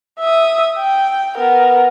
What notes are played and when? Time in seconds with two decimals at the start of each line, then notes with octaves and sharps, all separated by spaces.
0.20 E5 D#6
0.79 G5
1.37 B3 A#4